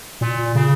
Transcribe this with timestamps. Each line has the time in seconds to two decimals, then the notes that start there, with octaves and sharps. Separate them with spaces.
0.21 A#2
0.55 C#3